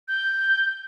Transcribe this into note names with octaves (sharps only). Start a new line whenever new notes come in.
G6